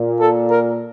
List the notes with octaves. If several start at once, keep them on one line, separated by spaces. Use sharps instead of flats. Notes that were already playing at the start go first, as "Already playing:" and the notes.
Already playing: A#2
A4
A#4